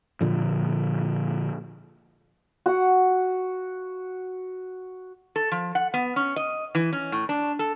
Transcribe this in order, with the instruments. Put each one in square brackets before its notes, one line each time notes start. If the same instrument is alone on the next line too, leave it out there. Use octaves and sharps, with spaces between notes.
[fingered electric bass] A#2 D3 F3
[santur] F#4 F#5
[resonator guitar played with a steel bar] A4
F3
F#5
B3
C#4
D#5
E3
C#4
A2
D4
A4